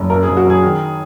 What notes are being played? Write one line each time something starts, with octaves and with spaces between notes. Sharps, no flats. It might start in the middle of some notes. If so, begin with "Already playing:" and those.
Already playing: F#1
F#2 A#4
F#1 G#4
F#4
F#1 G#4
D#3